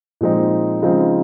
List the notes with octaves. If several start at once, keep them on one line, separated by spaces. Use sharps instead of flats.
A#2 F3 G#3 C4 D#4
C#3 F3 G#3 C4 D#4